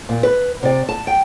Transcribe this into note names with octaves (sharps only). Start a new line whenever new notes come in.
A#2
B4
C3 D5
A5
G5